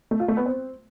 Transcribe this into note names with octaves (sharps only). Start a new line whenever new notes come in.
A3
F4
A3
B3
C4